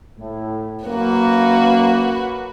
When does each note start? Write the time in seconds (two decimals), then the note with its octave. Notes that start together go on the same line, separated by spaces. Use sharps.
0.18 A2
0.85 F#2 A#3 F#4 B4